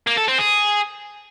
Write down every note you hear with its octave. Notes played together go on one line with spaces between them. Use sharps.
A#3
A4
C4
G#4